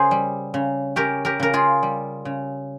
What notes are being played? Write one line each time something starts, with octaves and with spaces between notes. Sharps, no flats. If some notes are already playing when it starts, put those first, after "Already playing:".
Already playing: C#3 G#4 A#4 C5
G3
C#3
C#4 G4 A#4
G4 A#4
C#3 A#4
F4 G#4
G3
C#3